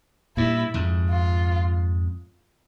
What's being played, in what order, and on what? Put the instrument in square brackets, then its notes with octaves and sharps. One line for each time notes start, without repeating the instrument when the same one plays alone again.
[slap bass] G2 A#2 [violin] E4
[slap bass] F2 G#2
[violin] F4